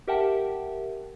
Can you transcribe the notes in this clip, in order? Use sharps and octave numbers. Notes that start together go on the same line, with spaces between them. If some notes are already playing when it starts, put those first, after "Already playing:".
G4 A#4 E5 F#5 G5 A5